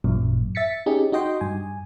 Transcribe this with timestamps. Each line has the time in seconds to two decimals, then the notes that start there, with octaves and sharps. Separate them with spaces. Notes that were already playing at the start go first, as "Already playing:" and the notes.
0.04 A1 F#2 A#2
0.55 E5 A6 B6 C#7
0.86 C#4 D#4 G4 G#4
1.12 D#4 F#4 D#5 G5 C6
1.41 G2 G#5